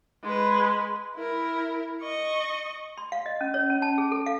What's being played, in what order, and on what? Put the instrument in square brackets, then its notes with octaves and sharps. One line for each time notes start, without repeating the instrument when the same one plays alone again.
[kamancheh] G#3 B4
E4 A#4
D#5 C#6
[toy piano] C6
F5
D#5
C#4
C#5
C#4
A5
G#4
A4
F5